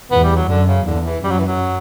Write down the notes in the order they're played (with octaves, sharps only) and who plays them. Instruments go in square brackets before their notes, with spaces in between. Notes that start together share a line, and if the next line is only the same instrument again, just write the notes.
[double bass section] E2 [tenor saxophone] B3
[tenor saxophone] G3
F#3
[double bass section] F#2 [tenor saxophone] D3
[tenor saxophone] C#3
[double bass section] E2 [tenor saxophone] D3
[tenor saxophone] E3
[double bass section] F#2 [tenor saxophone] G3
[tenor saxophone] F#3
E3
F#3